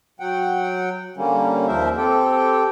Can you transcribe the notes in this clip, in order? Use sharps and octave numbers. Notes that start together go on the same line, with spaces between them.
F#3 F#5 G5
D3 G3 A#3 C#4
D#2 F3 A#4 C5 E5
C4 G4 A4 G5